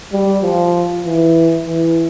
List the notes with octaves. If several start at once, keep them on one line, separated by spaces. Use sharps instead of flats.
G3
F3
E3
E3